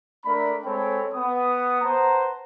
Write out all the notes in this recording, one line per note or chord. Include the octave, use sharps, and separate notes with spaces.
A3 D4 A#4 D5 B5
G#3 C4 A4 C#5 G5 B5
B3 D#6
B4 C5 F#5 A5 A#5